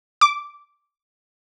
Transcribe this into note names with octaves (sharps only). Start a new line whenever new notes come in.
D6